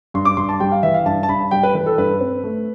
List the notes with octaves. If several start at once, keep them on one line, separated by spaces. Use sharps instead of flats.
G2 C6
D6
G2 C6
A5
G3 G5
F5
E3 E5
F5
G2 A5
A5
G2 B5
G3 G5
B4
E3 B4
A4
G2 B4
C4
A3